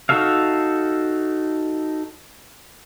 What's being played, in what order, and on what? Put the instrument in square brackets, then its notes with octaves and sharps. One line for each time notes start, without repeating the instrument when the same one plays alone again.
[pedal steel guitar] D#4 F#4 A4 E5 F5